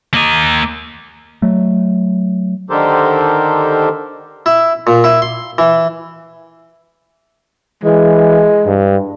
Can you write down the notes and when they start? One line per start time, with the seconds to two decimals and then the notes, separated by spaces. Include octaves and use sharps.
0.14 A#3 D#5
1.42 F#3 A3
2.70 D3 D#3 G4 A4 A#4 C5
4.46 E4
4.87 A#2
5.04 E4
5.22 C6
5.58 E3
7.84 E3 G#3
8.66 G2